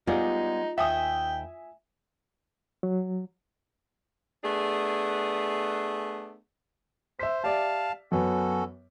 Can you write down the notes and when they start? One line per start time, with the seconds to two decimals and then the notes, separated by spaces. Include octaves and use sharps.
0.07 G3 G#3 B3 D#4 F4 G#4 D5
0.78 D#2 E5 G5 G#5 D#6
2.83 F#3
4.43 A3 B3 D4 G#4
7.19 C5 E5 B6
7.44 G4 D5 E5 F5 A5
8.12 F#2 B3 C#4 F#4 A4